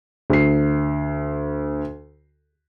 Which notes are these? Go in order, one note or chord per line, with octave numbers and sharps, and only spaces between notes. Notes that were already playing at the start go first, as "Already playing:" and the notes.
D2 C7